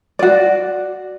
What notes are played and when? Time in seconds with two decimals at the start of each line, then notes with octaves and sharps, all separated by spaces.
0.19 F#4 D5